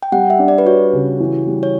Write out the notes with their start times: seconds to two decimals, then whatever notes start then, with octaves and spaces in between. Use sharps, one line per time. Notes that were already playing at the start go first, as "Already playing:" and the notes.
0.03 G5
0.12 G3 F#5
0.30 E5
0.39 D4
0.48 D5
0.58 B4
0.65 F#4 C#5
0.93 C#3
1.20 E3
1.47 G3
1.63 C#5